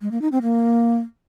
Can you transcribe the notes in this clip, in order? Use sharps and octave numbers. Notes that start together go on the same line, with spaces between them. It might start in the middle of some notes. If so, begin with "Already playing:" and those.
G#3
A#3
D#4
C4
A#3